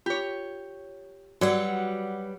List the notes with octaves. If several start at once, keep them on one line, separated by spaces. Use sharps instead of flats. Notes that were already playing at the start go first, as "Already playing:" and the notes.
F4 G4 C#5
F#3 G3 F#4 B4 D5 F#5 E6